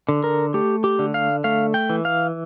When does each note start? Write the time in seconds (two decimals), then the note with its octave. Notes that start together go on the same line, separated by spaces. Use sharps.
0.09 D3
0.24 A#4
0.54 A3 G4
0.84 G4
0.99 D3
1.14 F5
1.44 A3 F5
1.74 G5
1.90 E3
2.05 F5